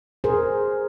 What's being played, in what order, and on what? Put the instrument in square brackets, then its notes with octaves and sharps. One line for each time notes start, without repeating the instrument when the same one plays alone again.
[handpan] G#4 A#4 C5